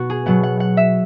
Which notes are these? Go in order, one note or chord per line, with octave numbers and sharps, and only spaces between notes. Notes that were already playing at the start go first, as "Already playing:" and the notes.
Already playing: B2 B3 F#4 B4
G#4
B2 F#3 B3 F#5
F#5
F#5
E5